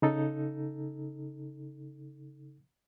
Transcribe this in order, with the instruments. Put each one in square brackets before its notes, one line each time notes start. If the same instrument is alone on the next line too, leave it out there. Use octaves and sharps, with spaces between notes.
[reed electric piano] C#3 D#4 A4